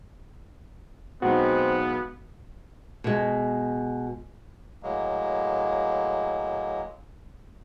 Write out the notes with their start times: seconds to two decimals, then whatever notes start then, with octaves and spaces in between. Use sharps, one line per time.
1.22 B1 G#3 B3 C4 D#4 F#4
3.04 B2 G#3
4.83 A2 F#3 G#3 A#3